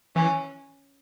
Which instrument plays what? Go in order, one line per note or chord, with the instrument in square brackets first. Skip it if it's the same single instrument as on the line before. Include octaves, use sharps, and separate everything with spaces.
[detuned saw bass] E3 [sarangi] C#4